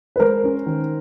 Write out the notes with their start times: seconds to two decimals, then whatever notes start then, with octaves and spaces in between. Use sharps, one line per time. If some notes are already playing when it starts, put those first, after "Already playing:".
0.16 B4
0.19 G#3 A#4 C5
0.44 C#4
0.66 D#3